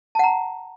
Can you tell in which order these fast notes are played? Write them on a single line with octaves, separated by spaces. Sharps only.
A5 F#5 A#5